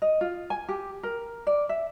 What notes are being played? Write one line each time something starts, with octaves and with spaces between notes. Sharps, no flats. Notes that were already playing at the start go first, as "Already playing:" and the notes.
D#5
F4
G#5
G4
A#4
D5
E5